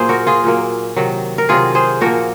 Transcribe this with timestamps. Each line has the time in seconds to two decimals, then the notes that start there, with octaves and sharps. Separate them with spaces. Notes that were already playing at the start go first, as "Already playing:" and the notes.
Already playing: A#2 F#3 A#3 G#4 C5
0.09 F#4 A#4
0.27 F4 G#4
0.44 A#2 F#3 A#3
0.96 C3 D#3 F#3
1.38 A#4
1.49 C3 D#3 F#3 F4 G#4
1.75 G#4 C5
2.01 A#2 F3 A#3 F#4 A#4